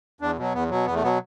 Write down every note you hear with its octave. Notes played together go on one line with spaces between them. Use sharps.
E2 D4
B2 F#3
E2 B3
B2 F#3
E2 B3
A3
B2 F#3 B3